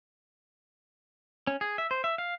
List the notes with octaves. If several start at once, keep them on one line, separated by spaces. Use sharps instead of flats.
C#4
G#4
E5
C5
E5
F5